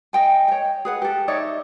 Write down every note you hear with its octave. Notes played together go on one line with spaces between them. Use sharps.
D#5 G5 G#5
C#5 G5
G#4 B4 F#5
G4 A4
D#4 C#5 D5 E5